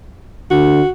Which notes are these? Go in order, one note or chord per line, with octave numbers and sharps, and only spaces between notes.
D3 F#4